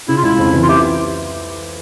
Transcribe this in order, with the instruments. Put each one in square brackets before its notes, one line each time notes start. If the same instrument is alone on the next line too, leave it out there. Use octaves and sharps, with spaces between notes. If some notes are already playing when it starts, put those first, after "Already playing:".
[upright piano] C#3 [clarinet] E4
[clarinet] F4
[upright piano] C#2 [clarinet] E4
[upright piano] F2
E3
[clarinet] F4
[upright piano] E4 [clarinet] G4